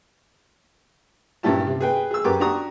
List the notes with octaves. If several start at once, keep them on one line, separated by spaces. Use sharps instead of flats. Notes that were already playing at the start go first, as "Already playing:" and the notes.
G2 A#2 C#4 E4 G4 A5
C3
G#4 B4 G5
G#4 E6
F#2 A#3 G4 B4 D6
D4 F#4 G4 A#5 C#6 D#6